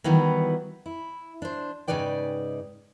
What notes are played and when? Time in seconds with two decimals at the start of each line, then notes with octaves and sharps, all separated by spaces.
0.04 D#3 E3 F#3 G3 B3
0.86 E4
1.42 D4 C5
1.87 G#2 C#3 D#4 B4 D5 G5